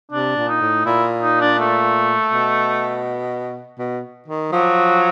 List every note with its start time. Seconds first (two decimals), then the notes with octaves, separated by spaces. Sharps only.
0.12 C3 D4
0.36 A#2
0.49 D#4
0.61 A2
0.85 A#2 E4
1.22 D#4
1.41 D4
1.59 A3
2.32 B2
3.78 B2
4.28 D#3
4.52 F3 F#3